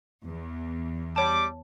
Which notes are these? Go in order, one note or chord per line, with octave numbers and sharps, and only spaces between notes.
E2
G3 C#5 A5 D6